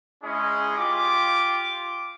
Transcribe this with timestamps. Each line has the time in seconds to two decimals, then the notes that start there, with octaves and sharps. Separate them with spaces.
0.24 G#3 C#4 E4 G#4 D#5
0.77 F4 G4 D6